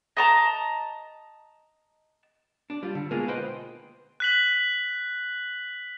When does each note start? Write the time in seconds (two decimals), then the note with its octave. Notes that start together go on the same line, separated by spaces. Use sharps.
0.17 D#5 A5 A#5
2.70 D4
2.83 G3 F4
2.95 D3
3.11 B2 G#3 A#3 F4 G#4
3.28 B4 C5 D#5 G5 C6
4.20 F#6 B6 F#7